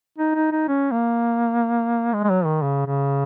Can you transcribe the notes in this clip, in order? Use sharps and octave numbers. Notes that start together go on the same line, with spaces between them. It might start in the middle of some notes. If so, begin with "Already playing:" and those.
D#4
D#4
D#4
C#4
A#3
G#3
G#3
F#3
D#3
C#3
C#3